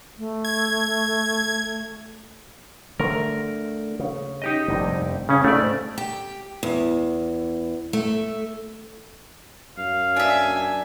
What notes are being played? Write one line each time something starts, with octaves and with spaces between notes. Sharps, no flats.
A3
G#6
D3 A3 A#4
C#3
D#4 G4 D#5
F1 G2 D3
C#3 C#4
G#2 A3 D5
G4
E2
A3
F#2 F5
D4 E5 G#5